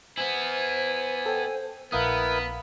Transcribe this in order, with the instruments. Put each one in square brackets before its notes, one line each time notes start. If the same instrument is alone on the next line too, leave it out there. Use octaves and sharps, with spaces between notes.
[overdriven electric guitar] B3 E4 [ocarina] C5 [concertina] G#5
[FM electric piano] A4 G5
[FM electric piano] A#1 F5 D#6 [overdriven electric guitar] B3 [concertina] E4 A#4 B4